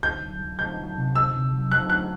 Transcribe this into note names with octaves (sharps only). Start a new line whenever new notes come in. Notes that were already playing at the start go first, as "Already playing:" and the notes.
D2 G6
F#3
F#3
D2 G6
F#3
C3
D2 E6
C3
F#3
F#3 F#6
D2 F#6